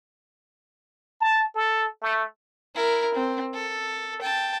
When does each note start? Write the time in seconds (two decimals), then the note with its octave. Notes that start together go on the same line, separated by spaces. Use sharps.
1.21 A5
1.55 A4
2.02 A3
2.75 E4 A#4
3.15 C4
3.54 A4
4.21 G5 A5